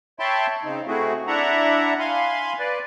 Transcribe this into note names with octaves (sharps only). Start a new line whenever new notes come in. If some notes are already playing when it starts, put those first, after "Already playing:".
C#5 E5 G5 A5 B5 C6
C#3 C4 D#4
A3 C4 E4 F#4 G#4
D4 E4 E5 F#5 A#5
F5 G#5 B5 C6
B4 D5